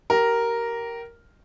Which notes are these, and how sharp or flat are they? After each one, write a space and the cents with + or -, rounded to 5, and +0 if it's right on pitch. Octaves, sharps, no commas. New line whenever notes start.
G4 -20 A#4 +0